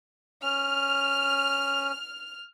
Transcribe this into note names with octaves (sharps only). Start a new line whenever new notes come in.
C#4 F6